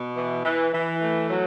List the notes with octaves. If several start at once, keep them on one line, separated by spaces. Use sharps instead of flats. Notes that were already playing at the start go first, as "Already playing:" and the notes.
Already playing: B2
E3
E3
E3
A3
F#3